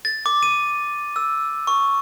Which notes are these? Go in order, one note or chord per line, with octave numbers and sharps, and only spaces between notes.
A6
D6
D#7
E6
C#6